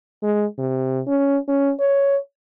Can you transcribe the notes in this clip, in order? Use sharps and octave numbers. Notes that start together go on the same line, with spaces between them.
G#3
C3
C#4
C#4
C#5